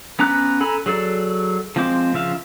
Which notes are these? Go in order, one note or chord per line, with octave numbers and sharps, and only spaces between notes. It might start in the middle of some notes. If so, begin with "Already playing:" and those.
B3 C#4 A#5 D6 F#6
A4 G#5 A#5 B5
F#3 G#4 A4 D5
F3 G#3 C4 C5 D6
C#3 F3 E5 F5